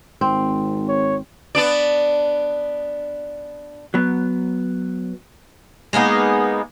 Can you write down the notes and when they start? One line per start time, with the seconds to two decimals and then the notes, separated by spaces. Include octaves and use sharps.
0.21 G#1 C4
0.89 C#5
1.55 B3 D4 D5
3.94 F#3 B3
5.93 G#3 A#3 B3 D#4